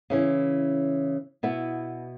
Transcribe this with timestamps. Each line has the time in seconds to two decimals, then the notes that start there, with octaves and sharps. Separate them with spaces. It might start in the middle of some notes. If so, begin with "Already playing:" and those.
0.10 C#3 E3 C#4 E4
1.43 B2 B3 E4